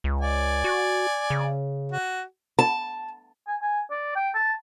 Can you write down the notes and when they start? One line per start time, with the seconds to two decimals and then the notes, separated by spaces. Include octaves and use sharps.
0.04 C#2
0.21 D5 G#5
0.64 F#4
1.30 C#3
1.92 F#4
2.59 A5
3.47 G#5
3.62 G#5
3.91 D5
4.16 G5
4.35 A5